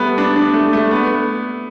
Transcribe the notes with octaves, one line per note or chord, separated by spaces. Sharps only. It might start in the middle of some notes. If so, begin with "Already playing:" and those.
Already playing: G3 A3 B3
D4
D4
A3
A3
B3